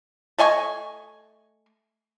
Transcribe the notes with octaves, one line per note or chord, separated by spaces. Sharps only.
A3 D#5 G#5 C#6